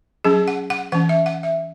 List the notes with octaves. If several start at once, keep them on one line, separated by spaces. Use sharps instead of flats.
F#3 C#4 G#4
F#5
F#5
E3 C#4 F#5
E5
F#5
E5